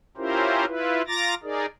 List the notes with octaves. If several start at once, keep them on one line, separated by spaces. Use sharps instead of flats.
C#4 E4 F4 G4 A#4 C5
E4 F4 B4
F4 A#5 D6 A6 A#6
D#4 G#4 A#4 D5